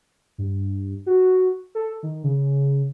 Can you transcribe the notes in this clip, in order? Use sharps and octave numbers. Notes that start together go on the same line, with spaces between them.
G2
F#4
A4
D#3
C#3